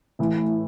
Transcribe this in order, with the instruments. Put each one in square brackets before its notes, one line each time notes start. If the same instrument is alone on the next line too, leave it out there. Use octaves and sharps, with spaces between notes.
[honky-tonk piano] A2 E3